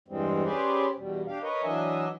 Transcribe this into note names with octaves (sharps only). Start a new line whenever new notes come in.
E2 G2 E3 G3 G#3 C4
C#4 G4 G#4 B4 C5 D5
E2 B2 G3
D4 G4 F5
A#4 B4 C#5 D#5
E3 F#3 D4 D#5 E5 G#5